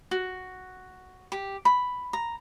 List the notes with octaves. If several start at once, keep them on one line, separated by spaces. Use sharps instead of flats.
F#4
G4
B5
A#5